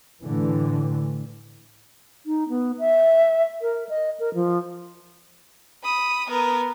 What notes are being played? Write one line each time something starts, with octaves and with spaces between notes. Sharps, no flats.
A2 D3 E3
D#4
B3
E5
A#4
D#5
A#4
F3
B5 D#6
B3 A#4